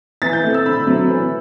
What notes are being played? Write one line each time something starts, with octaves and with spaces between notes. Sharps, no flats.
E3 A6
G6
A3 C4
E6
D3 B5
F#3 A3 C4
E3